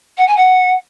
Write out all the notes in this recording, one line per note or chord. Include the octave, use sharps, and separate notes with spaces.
F#5
G#5
F#5